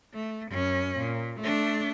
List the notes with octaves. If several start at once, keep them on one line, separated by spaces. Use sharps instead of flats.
A3
F#2 C#4
A#2
A3 D4